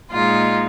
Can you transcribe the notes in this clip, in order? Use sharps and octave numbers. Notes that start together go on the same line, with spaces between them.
A#2 G#3 D#4 F4